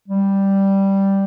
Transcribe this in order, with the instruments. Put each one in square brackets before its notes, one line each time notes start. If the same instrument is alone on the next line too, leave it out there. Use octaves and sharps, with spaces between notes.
[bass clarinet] G3